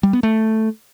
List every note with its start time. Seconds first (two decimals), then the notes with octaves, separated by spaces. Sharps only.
0.03 G3
0.13 B3
0.23 A3